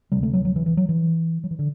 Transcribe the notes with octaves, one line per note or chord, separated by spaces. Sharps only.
D2 C3 G3
A3
F#3
F#3
E3
E3
F#3
E3
F#3
E3
D3